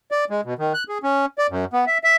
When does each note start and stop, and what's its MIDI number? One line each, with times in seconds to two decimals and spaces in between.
0.11 0.25 74
0.30 0.41 56
0.45 0.54 47
0.59 0.73 51
0.74 0.84 90
0.89 0.98 68
1.03 1.26 61
1.38 1.47 74
1.50 1.65 42
1.73 1.85 59
1.87 1.98 76
2.04 2.16 76